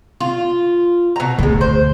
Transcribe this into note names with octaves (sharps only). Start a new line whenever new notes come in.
F4
B2 A#5
A1 D2 A2 G#3
C5